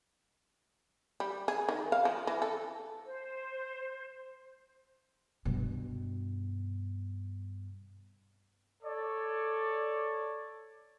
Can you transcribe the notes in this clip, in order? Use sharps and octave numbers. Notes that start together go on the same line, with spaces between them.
G3
G#4
D#3
F5
F3
E3
A4
C5
G2 B2
A4 C#5 D5